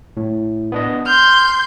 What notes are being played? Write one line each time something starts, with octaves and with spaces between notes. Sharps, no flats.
A2
B3 D4 D#5
C6 F6 G6